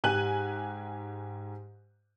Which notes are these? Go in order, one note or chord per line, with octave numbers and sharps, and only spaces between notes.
G#2 G4 G#5 F#6 D#7 F#7